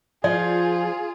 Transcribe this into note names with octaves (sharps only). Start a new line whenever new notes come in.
F3 F4 G#4 D5